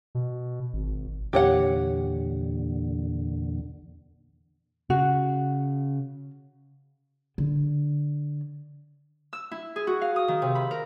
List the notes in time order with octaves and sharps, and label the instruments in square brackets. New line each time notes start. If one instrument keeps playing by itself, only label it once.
[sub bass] B2
G#1
[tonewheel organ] E2 A#2 D3 [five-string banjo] G4 C#5 F#5
[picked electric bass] C#3 [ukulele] F#4
[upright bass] D3
[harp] E6
E4
G#4
F#4
F5
D#6
D#3
C3
B5
A#4